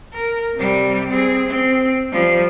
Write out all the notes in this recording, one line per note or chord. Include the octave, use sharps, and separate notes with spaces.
A#4
C3 G3
C4 G#4
C4
F3 G3